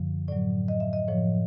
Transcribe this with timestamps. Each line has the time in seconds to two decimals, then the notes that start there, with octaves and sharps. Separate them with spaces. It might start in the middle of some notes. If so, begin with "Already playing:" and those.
Already playing: F#2 D3 F3
0.28 A2 F#3 D5
0.68 D#5
0.80 E5
0.93 D#5
1.08 A2 F3 C#5